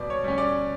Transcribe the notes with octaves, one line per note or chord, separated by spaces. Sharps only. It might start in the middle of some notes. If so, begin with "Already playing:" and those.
Already playing: B2 G3 D5
C#5
G3 C#4
D5